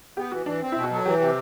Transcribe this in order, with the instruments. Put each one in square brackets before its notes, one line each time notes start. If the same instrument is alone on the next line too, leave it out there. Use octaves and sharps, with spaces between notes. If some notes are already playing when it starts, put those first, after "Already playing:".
[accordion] B3 [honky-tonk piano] G4
[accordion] E3 [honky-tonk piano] F#4
[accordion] E3 [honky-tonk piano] D4
[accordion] C4
[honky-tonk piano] E4
[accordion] B2
[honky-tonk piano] F#4
[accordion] F#3 [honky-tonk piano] A4
[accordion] E3 [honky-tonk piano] G4
[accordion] C3